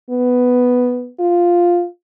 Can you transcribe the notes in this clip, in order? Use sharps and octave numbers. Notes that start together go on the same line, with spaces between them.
B3
F4